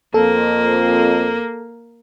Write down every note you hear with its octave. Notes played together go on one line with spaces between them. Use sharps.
F2 A#3 A4